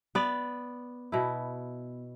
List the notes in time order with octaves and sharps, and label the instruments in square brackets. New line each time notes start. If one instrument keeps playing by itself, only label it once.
[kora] B3 D5
B2 E4